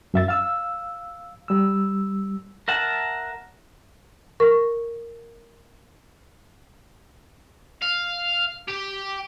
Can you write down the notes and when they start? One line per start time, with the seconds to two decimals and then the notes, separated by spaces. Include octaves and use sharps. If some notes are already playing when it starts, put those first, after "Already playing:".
0.14 F#2 E5 A6
0.28 F5 E6
1.48 G3 E6
2.68 A#4 E5 F#5 A5
4.40 A#4 C#6
7.82 F5
8.68 G4